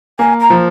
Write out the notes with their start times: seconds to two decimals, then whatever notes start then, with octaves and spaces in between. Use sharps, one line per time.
0.19 A#3 G#5
0.39 A#5
0.50 F3